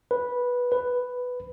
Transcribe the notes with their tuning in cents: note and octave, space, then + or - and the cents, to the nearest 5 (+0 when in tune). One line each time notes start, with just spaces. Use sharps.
B4 -10
B4 +5